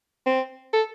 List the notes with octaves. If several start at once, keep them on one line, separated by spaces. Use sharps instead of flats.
C4
A4